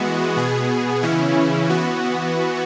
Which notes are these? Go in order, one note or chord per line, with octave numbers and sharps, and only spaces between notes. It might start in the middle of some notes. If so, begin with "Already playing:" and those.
Already playing: E3 G#3 B3 F#4
B2 B3 G#4
C#3 E3 C#4 E4
E3 B3 F#4